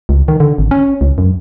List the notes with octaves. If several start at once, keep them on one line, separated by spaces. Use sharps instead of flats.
C#2
D#3
D3
G#1
C#4
C#2
F#2